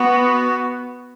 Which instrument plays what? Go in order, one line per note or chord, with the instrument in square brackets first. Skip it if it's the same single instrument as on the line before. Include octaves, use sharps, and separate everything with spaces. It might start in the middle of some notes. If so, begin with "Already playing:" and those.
Already playing: [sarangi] B3 [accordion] F#4